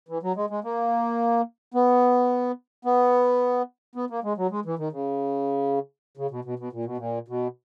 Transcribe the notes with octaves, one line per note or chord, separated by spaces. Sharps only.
E3
F#3
G#3
G#3
A#3
B3
B3
B3
A#3
G#3
F#3
G#3
E3
D#3
C#3
C#3
B2
B2
B2
A#2
B2
A#2
B2